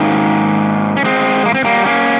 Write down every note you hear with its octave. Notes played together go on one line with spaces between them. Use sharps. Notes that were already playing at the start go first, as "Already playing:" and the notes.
Already playing: G#2 D#3 A#3 C#4
C#4
G#3 C4
A#3
C4
G3 A#3
A#3 C#4